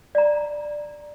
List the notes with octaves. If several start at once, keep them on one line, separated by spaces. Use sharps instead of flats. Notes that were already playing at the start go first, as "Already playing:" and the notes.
D5 A#5